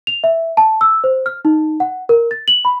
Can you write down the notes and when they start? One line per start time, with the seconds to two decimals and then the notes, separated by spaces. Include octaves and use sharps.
0.07 F7
0.24 E5
0.57 A5
0.81 E6
1.04 C5
1.26 F6
1.45 D#4
1.80 F#5
2.09 A#4
2.31 A6
2.48 F#7
2.65 B5